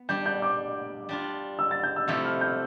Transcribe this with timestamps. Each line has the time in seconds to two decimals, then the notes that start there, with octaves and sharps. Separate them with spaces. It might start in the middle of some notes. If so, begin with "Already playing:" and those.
Already playing: B3
0.09 G3 D4 G4 G6
0.26 G6
0.42 D6
1.09 G3 D4 F4
1.59 E6
1.71 A6
1.83 G6
1.96 E6
2.08 C3 F3 A3 E4 G6
2.25 F6
2.41 G6